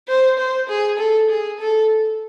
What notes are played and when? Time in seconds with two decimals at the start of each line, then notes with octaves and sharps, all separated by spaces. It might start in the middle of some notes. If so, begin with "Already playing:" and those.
0.08 C5
0.39 C5
0.69 G#4
0.99 A4
1.30 G#4
1.60 A4